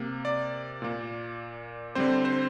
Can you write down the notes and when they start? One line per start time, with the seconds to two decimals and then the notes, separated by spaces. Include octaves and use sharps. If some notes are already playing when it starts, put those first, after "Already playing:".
Already playing: C3 A#3
0.25 D5
0.82 A#2 A#3
1.95 D3 G3 C4 C5
2.25 C5